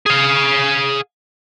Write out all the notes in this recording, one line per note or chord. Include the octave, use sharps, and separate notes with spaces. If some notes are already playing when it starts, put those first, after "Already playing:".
G#4 F5